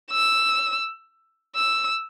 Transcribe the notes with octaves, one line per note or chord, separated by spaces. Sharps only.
E6
E6